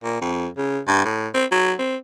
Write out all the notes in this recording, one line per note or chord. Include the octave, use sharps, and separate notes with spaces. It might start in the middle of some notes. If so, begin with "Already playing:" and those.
A#2
F2
C#3
G2
A2
C4
F#3
C4